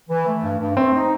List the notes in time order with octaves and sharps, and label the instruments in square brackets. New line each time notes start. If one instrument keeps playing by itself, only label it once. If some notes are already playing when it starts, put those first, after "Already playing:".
[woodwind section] E3
A3
G2
G2
[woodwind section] A3 [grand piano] C4
[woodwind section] D#4